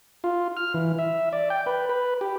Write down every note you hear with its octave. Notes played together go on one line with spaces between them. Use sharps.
F4
F6
E3
E5
D5
G5
B4
B4
G4